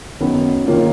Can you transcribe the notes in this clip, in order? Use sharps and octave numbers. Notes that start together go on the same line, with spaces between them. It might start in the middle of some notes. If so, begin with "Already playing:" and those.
F#2 D#3 F#3 B3 F#4
D#3 A#3 C#4 F4